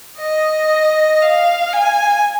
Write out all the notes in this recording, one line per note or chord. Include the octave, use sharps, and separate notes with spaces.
D#5
F5
G#5